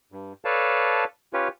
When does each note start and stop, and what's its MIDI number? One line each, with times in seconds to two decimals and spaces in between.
0.12 0.33 43
0.45 1.04 69
0.45 1.04 71
0.45 1.04 73
0.45 1.04 74
0.45 1.04 77
0.45 1.04 81
1.33 1.48 61
1.33 1.48 65
1.33 1.48 67
1.33 1.48 71
1.33 1.48 73